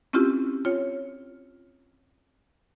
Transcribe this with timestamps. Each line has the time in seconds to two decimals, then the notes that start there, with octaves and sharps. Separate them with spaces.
0.13 C4 C#4 E4 F4 G4
0.65 F4 C#5